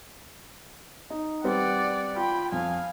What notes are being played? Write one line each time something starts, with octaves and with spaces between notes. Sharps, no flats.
D#4
G3 C4 B4 D5 F#5
F4 G5 B5
F2 F5 G#5